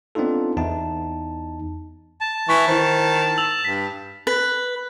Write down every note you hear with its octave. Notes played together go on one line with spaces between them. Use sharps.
B3 C4 D4 D#4 F4 A4
E2 D#4 A5
A5
E3 C#6 B6
D#3 E4 C5
E6 F7 F#7
G2 B6
B4